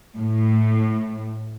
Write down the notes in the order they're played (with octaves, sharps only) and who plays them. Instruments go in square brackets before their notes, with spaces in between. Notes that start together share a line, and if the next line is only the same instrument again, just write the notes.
[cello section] A2